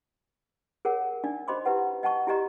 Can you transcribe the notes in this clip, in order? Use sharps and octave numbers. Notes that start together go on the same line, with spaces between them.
G#4 A#4 C#5 F#5
D4 D#4 D5
F#4 C5 D#5 B5 C6 D6
E4 G4 B4 F#5
D#5 F#5 A5 C#6
E4 F#4 G4 D5 D#5 A#5